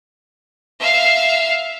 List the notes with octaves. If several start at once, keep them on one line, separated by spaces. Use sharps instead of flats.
E5 F5